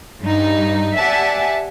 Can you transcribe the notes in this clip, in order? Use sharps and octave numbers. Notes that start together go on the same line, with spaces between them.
G2 D#4
G4 D5 E5 F#5 G#5 A5